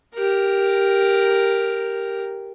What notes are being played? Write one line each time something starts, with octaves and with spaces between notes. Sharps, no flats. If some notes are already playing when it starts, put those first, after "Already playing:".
G4 A#4